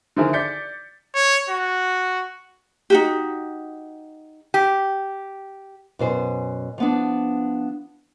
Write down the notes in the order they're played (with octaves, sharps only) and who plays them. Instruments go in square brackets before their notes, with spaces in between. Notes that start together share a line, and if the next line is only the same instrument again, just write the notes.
[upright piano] D3 D#3 F3 E4 G#4 A#4
D5 G6 A6 B6 C#7
[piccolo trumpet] C#5
F#4
[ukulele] D#4 F#4 G4
[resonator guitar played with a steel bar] G4
[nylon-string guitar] F#2 B2 C5 G#5
F3 B3 D4